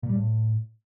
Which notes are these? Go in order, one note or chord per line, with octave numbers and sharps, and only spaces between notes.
A#2
G3
A2